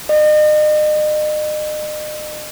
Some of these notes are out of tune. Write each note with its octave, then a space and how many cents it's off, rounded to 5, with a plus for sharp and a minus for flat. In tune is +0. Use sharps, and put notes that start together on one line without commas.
D#5 -40